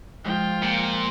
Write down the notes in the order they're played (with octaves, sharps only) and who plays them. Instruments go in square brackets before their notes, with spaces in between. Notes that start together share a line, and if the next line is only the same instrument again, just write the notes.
[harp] F3 G#3 F#6 [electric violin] F4 G5
[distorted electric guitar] A#2